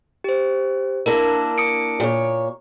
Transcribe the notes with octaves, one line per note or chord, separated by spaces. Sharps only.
G4 C5
A#3 D4 E4 A#4
D#6 C#7 D7
A#2 C#5